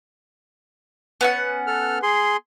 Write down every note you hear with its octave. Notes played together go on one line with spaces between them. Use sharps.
B3 C#4 F#5
A4 F6
G#4 C6